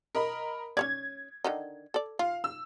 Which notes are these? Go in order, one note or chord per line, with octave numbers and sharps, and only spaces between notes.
A#4 D#5 B5
C#4 C#5 D5 G#6
D3 D#3 D#4
A4 D5
F4 F5
E6